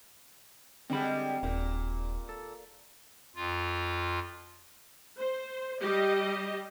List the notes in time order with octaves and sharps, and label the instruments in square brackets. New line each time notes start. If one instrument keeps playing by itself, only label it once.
[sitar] D3 G3 G#3 [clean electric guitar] C4 B5
[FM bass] D#1 [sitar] A#2
[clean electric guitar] A4
[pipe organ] F2 F4
[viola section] C5
G3 G4 D#5